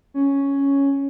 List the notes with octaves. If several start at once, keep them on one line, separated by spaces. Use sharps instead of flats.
C#4